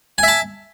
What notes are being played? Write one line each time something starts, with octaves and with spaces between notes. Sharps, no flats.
E5 G#5 A5